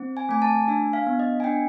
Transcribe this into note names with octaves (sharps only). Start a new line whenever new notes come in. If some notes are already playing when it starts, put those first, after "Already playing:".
Already playing: C4
G#5
A3 G#5
A5
D4 G#5
F5
B3
D#5
G#5
D4 G5